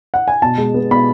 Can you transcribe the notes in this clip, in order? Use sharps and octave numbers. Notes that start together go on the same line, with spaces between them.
F#5
G#5
B2 A5
G#3
B3
B2 B5